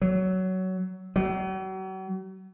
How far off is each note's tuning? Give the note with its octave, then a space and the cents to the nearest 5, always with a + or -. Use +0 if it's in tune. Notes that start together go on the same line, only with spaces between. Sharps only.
F#3 +15
F#3 +40